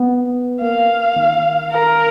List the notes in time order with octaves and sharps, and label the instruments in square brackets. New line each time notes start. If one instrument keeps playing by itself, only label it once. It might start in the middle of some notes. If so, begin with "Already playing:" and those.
Already playing: [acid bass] B3
[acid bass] A#3 [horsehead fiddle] F5
[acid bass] D#3
[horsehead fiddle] A#4